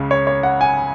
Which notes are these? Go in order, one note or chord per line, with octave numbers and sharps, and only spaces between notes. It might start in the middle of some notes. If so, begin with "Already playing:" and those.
Already playing: C#2 C#3
C#5
C#5
F#5
G#5